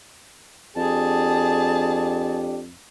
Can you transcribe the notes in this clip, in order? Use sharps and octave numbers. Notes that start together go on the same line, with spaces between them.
F2 D4 G4 G#4 A5